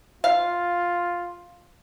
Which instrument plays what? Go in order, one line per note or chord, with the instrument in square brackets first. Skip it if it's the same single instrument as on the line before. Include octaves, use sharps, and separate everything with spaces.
[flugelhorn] F4 [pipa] F5